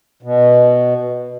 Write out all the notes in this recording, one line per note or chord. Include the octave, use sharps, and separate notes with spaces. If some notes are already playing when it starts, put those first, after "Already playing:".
B2